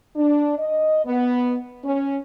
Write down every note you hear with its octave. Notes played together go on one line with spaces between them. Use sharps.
D4
D#5
B3
C#4